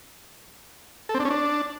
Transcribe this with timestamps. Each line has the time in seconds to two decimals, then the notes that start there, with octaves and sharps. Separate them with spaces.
1.09 A4
1.15 C4
1.20 D4
1.25 C#4
1.30 D4